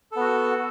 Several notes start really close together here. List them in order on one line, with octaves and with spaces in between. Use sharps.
A4 B3 F#4